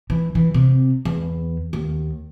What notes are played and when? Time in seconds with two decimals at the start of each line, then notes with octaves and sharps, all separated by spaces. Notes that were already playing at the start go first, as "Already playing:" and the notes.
0.10 E3
0.35 E3
0.54 C3
1.05 E2
1.73 D#2